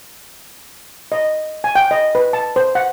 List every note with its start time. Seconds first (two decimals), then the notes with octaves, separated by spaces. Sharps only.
1.12 D#5
1.64 G#5
1.75 G5
1.91 D#5
2.15 B4
2.33 A5
2.56 C5
2.75 F#5